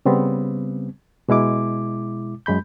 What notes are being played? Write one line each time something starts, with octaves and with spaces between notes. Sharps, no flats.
C#3 G3 B3 C4
B2 G#3 E4 D6
F#2 G#3 B5 G6